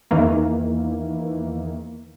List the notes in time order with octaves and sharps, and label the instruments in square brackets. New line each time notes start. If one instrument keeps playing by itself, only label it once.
[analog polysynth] E2 D#3 E3 A#3